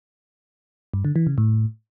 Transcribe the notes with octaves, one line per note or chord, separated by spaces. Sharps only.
G2
D3
E3
C#3
A2